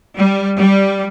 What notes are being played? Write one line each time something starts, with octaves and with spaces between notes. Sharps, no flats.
G3
G3